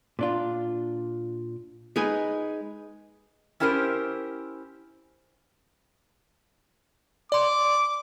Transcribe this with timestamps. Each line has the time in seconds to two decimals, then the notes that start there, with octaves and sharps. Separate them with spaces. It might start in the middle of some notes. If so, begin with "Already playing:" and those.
0.19 A#2 D4 F4
1.96 G#3 D#4 B4 G#5
3.60 C#4 E4 G4 A#4 C5
7.32 D5 C6 D6